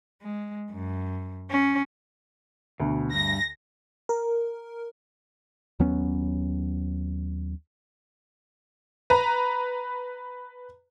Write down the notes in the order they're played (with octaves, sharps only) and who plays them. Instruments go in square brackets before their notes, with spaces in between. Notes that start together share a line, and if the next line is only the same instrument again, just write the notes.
[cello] G#3
F#2
C#4
[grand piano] D2 [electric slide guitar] B2
[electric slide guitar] G2 [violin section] A#6
[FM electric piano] A#4
[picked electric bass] D#2 F#3 B3 C#4
[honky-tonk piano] B4 A#5